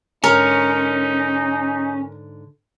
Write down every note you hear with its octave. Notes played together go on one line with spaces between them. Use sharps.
G#2 D3 C#4 D#4 A#4 C#5